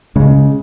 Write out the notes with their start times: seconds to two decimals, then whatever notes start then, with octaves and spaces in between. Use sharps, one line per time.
0.16 C#3 G#3